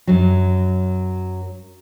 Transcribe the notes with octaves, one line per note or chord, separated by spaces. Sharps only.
F#2 F#3